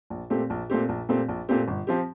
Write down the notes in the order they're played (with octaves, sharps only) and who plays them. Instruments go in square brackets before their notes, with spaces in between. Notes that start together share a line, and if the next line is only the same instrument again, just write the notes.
[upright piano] A#1
A#2 A3 C4 G4
A#1
A#2 A3 C4 G4
A#1
A#2 A3 C4 G4
A#1
A#2 A3 C4 G4
G1
F3 C4 G4